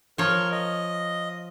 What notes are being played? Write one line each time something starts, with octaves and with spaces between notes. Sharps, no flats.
F3 A#4 C#5
D#5